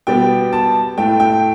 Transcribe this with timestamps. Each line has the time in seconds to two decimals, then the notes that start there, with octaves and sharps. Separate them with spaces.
0.07 B2 G3 B3 G5
0.53 A5
0.97 A2 A3 G5
1.20 G5